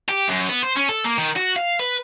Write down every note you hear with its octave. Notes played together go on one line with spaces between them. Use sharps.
G4
F#2
B3
C5
C#4
A4
A#3
D#3
F#4
F5
B4